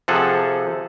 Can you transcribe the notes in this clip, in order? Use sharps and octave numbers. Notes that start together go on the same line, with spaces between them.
C3 F3 G#4 A4 F#5